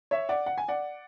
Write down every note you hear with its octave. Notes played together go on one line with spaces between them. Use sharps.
C#5 E5
D5 F#5
F#5
G#5
D5 F#5